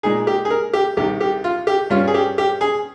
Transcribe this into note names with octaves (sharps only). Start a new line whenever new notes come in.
A#2 G#3 D#4 G#4
G4
G#4
A#4
G4
C2 C3 D#3 G4
G4
F4
G4
G2 G3 C#4 F4
G#4
G4
G4
G#4